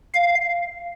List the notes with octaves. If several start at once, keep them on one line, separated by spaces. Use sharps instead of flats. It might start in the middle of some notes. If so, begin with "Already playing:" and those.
F5